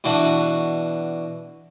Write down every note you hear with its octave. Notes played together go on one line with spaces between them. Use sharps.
B2 E3 D4 F#4